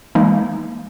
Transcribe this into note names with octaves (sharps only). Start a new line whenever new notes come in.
E3 G#3 A#3 D#4